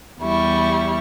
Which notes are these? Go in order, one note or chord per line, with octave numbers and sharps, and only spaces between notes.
E2 G3 E4 C#6